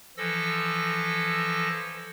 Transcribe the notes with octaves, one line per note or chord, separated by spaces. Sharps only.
E3 F3 A4 E6 A#6